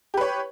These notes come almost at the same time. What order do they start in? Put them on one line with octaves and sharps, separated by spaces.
G4 B4 C#5